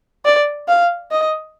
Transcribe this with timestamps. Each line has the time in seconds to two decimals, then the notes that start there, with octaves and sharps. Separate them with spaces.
0.25 D5
0.68 F5
1.12 D#5